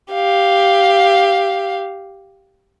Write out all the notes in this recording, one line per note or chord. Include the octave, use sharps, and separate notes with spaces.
G4 F5